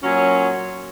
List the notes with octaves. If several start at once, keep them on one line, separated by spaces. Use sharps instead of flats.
A#2 F#3 C#4